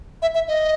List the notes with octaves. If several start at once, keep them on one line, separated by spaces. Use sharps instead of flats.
E5
E5
D#5